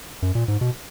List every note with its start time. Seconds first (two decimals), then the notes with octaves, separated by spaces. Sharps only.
0.22 F#2
0.35 A#2
0.48 G#2
0.61 B2